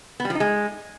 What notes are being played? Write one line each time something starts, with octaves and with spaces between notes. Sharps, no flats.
B3
G3
F3
D#4
G#3